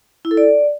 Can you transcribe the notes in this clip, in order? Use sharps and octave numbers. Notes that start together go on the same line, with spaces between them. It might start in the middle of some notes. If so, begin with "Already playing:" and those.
E4
A4
D5